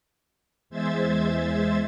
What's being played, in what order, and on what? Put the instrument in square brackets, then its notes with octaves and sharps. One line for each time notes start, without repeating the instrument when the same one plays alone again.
[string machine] E2 G#3 C5 E5 G#6 A6